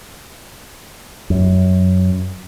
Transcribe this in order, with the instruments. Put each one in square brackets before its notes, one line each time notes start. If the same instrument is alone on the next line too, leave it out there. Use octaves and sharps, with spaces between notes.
[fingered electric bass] F#2